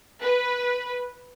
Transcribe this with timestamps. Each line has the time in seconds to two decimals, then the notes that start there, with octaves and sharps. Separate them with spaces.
0.21 B4